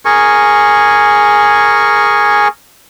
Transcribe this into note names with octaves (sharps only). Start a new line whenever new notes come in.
G#4 A#4 G#5 C#6